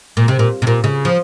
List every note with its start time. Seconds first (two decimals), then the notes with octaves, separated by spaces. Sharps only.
0.17 A#2
0.28 C3
0.39 A#2
0.62 C3
0.67 A#2
0.84 C#3
1.05 F3